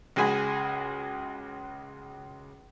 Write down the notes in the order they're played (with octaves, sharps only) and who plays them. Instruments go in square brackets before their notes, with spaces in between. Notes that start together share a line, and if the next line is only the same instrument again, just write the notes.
[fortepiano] C#2 G#3 F#4 G#4 G#5 B5